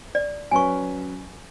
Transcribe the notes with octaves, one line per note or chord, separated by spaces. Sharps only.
D5
F#3 C#4 B4 G#5 C#6